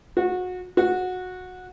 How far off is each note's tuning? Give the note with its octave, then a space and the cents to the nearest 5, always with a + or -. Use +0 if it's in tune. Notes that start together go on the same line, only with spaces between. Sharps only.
F#4 -25
F#4 -15